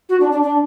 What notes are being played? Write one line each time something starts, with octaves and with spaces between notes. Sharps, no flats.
F#4
D4
D4
D4